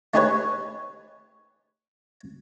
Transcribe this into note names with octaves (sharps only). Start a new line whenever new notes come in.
A3 D#4 G4 G#4 B4 C#5